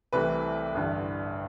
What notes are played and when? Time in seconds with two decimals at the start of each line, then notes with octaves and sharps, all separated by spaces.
0.13 C2 C3 E3 A3 B4
0.74 A1 G2 D3